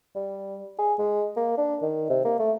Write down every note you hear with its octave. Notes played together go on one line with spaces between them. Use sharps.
G3
G#4
G#3
A#3
D4
D#3
C3
A#3
A3